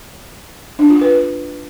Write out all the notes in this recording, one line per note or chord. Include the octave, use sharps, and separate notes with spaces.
D4
F4
B4